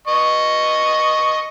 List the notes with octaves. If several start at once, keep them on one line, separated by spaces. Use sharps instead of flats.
D#5 C#6